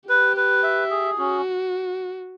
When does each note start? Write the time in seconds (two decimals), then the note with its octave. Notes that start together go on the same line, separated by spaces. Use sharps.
0.09 G4 B4
0.37 B4
0.63 E5
0.90 G#4
1.18 C#4 F#4